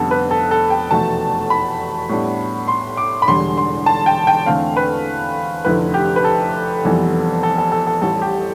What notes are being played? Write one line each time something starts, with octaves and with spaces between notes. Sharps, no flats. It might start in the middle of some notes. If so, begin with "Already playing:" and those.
Already playing: F1 F2 D3 G3 B3 A4
B4
A4
A4
G5
F1 E2 B2 A3 A5
B5
A2 G3 B3 D4
C6
D6
B5
E1 E2 D3 G3 C6
C6
A5
G5
G5
E2 D3 A3 C4 F5
B4
F1 F2 D3 A3 E4 B4
G4
B4
A4
F1 F2 E3 G3 B3
A4
A4
A4
A4
A1 A2 G3 A4
G4